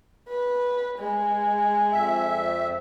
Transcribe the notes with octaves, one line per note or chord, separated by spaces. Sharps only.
B4
G#3
F2 E5